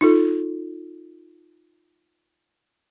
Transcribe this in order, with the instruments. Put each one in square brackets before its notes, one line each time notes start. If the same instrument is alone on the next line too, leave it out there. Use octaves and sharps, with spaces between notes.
[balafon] D#4 F4 A4